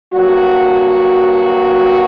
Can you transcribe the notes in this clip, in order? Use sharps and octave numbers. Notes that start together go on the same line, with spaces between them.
G2 F#3 A#3 F#4